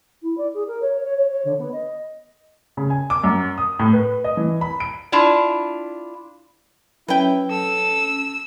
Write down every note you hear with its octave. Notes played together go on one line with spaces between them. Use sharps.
E4
D5
G#4
A#4
C#5
C#5
C#5
C#5
D3
B3
D#5
C#3
G#5
D6
F#2
D#6
A2
B4
D#5
E3
B5
D7
D4 E4 F4
F#3 C#4 E4 B4 G5
A4 E6